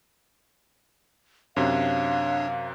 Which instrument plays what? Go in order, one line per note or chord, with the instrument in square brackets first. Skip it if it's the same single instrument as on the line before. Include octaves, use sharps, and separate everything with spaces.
[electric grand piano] F#2 C3 [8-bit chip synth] D4 C#5 [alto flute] F5